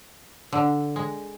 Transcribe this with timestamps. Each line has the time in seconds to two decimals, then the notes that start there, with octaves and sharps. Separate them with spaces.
0.53 D3
0.96 G#3